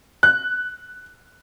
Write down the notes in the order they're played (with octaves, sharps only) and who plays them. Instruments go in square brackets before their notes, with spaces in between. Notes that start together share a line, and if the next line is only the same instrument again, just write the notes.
[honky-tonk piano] F#6